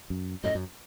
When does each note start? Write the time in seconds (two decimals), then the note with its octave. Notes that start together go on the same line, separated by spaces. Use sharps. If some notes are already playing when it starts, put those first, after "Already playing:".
0.10 F#2
0.44 F#2 A2 D#5
0.55 F#2